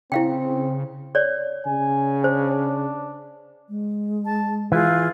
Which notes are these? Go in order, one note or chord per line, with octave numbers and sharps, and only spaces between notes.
C#3 C4 E4 F5 G5
C#5 D5
C#3 G#5
D4 C5
G#3
A5
E3 F4 G#4 F5